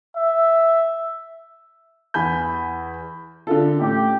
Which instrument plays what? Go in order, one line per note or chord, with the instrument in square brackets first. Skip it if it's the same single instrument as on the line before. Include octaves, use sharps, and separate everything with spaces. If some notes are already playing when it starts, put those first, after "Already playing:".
[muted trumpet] E5
[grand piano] E2 G#5 B5 G6
[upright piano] D3 F4 A4
[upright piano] A1 [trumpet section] G4